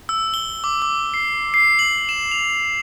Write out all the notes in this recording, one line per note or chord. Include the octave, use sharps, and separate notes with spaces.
E6
G7
D6
D6
C7
C7
F#7
E7
F7